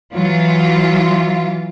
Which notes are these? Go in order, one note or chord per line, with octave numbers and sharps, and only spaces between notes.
E3 F#3 F4